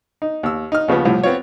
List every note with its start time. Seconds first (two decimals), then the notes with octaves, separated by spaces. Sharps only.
0.22 D#4
0.43 D#2 E6
0.72 D#4 F6
0.88 D#2 C#3 F3 B3
1.05 C2 A2 F3
1.23 B3 C4 F4 C#5